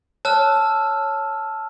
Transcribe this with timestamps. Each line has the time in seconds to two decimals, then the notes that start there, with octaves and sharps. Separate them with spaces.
0.25 C#5 A5 E6 F6